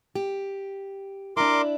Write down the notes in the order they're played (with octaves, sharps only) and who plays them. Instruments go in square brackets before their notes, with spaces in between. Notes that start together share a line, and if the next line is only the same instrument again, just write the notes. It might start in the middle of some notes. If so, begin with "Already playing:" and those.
[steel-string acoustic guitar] G4
[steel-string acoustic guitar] D4 E4 [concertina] A#4 C6 D6